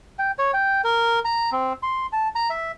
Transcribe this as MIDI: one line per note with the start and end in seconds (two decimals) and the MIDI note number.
0.19 0.31 79
0.39 0.51 73
0.54 0.81 79
0.84 1.19 70
1.25 1.50 82
1.52 1.73 60
1.83 2.06 84
2.13 2.28 81
2.35 2.50 82
2.50 2.72 76